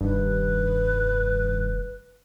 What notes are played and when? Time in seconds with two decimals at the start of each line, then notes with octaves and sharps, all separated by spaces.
0.01 F1 G2 D#3 B4